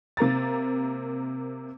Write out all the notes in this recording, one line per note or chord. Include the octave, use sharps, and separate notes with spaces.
C3 A#3 A#5 A6